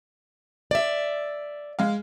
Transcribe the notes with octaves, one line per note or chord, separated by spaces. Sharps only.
D5 E5
G#3 F5